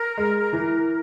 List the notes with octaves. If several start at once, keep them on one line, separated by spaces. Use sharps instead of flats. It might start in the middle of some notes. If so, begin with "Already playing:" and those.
Already playing: A#4
G#3
E3